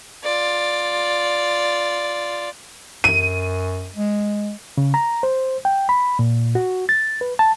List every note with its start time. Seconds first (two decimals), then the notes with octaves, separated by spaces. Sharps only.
0.24 F4 D5
3.04 F#2 D#7
3.96 G#3
4.78 C#3
4.94 A#5
5.23 C5
5.65 G5
5.89 B5
6.19 A#2
6.55 F#4
6.89 A6
7.21 B4
7.39 A5